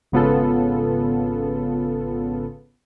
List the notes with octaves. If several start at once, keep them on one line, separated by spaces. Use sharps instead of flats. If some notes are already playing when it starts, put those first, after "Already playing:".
G#1 C#3 B3 F4 A4